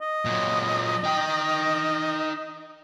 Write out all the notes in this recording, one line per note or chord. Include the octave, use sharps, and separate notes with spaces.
D#5
A#2 F#3
D#4 G5